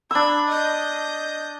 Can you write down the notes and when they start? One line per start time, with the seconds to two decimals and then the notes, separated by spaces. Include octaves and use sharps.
0.11 D4 B5 E6 G#6
0.47 D#5 G6